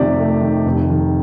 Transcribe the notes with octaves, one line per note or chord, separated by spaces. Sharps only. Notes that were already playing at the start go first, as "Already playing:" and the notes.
Already playing: F2 C3 D#3 A3 G4 D5
A3
D#3
F1
D#3